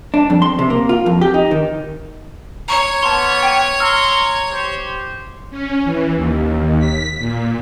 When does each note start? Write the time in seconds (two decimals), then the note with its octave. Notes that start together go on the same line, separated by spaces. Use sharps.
0.14 D4
0.30 F2
0.42 C6
0.59 C3
0.70 A#3
0.89 F4
1.06 F2
1.21 G4
1.34 D#4
1.51 D#3
2.68 C#5 A#5 C#6
3.03 A#3 B3 A5 C6
3.43 G5 D7 D#7
3.80 A#5 C6 E6 F6
4.50 G4 C5
5.51 C#4
5.85 E3
6.14 D#2
6.79 B6
7.19 A#2